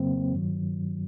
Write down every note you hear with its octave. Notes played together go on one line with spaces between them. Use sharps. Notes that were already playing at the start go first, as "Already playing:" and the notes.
Already playing: F2 C#3 F#3 A#3 C4
G2 D#3 F#3